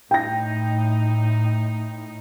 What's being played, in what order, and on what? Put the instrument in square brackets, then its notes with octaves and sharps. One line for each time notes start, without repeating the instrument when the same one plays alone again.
[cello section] A2 D#4 [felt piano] G5 A#6